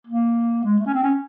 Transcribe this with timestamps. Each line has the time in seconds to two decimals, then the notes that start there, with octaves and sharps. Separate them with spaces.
0.07 A#3
0.64 G#3
0.79 A3
0.86 C#4
0.94 C4
1.03 C#4